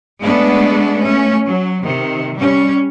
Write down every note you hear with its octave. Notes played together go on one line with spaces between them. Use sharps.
G#3 A3 B3 D4
A3 C#4
F#3
C3 D#3
G3 C#4